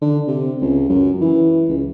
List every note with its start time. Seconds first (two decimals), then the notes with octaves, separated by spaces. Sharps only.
0.02 D3
0.28 C3
0.62 C#2
0.89 F#2
1.21 E3
1.69 C#2